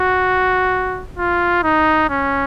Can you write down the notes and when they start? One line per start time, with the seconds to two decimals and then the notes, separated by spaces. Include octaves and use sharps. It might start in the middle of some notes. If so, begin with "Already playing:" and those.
Already playing: F#4
1.18 F4
1.63 D#4
2.09 C#4